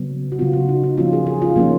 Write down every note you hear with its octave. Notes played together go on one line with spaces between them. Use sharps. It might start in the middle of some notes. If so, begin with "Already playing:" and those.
Already playing: C#3 F#3 B3
F#4
C#3 F#3 B3 F4
F#4
D#4
D#4
F3 A#3 C#4 F4
G#4
G#4
F4
F3 A#3 C#4 D#4